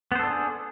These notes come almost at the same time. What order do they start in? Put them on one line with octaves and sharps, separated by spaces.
B3 C5 A4 D4 G#4